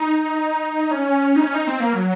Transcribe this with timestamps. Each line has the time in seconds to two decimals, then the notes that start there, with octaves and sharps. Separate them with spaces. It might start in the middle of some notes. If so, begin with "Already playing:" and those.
Already playing: D#4
0.91 C#4
1.36 D#4
1.42 C#4
1.54 D#4
1.67 C4
1.80 A#3
1.93 F#3